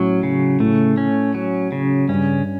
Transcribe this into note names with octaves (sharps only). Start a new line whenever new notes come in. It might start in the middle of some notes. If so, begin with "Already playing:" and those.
Already playing: A2 F#3 C#4
C#3
A2 A3
C#4
F#3
C#3
G2 C#4